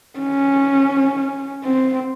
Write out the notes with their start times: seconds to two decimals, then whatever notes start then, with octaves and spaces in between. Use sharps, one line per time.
0.19 C#4
1.65 C4